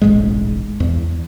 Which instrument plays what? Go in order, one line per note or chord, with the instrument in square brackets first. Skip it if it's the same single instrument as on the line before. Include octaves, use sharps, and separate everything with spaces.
[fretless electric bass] E1 A1 G#2 G#3
E2